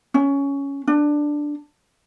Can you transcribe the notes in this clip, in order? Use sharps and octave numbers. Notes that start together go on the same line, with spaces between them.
C#4
D4